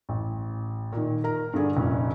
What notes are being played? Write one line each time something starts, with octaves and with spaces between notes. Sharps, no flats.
A1
A#2 D#3
A#4 A#5
G2 D3 G#4 D5
F1 A#2 C#4